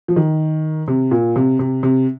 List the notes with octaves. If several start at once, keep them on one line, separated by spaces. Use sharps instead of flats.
F3
D#3
C3
A#2
C3
C3
C3